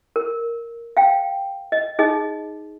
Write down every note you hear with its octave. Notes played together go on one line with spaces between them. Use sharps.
A#4
F5 G5
D#5
D#4 G#4 D#5